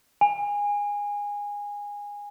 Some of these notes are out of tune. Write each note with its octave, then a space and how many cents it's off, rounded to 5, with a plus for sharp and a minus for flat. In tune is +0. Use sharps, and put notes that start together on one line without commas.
G#5 -20